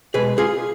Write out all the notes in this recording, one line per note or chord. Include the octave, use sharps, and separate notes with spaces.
B2 G#3 G#4 B4
F4 G#4